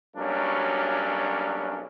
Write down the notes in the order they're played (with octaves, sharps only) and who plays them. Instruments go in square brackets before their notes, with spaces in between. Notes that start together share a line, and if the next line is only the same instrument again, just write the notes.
[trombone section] B1 F#3 G3 A#3 C#4 D4